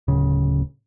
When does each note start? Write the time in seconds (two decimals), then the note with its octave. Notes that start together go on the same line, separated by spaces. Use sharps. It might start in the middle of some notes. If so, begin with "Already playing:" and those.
0.08 D1 C#3